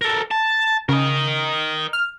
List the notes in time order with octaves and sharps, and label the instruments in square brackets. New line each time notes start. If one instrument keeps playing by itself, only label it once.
[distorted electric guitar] A4 A#4
A5
[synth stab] C#3 [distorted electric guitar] A#4 D#5
[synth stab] F6